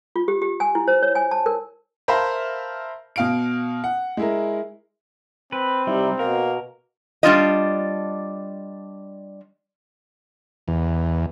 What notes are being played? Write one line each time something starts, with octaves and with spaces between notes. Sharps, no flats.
F4
G4
G4
G#5
E4
C5
C#5
G#5
A5
A#4
A#4 C5 E5 F5 A5 B5
B2 F5 D7
F#5
G#3 E4 A#4
C4 B4
C3 G3 D#4 E4
B2 A#3 A#4
G3 D4 F4 D#5
E2